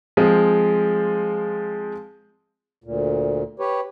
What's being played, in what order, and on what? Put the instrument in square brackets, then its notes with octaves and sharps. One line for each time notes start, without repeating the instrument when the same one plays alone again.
[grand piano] F3 G#3 C4
[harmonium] D2 A#2
G4 B4 C#5